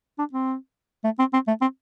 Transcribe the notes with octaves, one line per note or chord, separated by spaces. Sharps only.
D4
C4
A3
C4
C4
A3
C4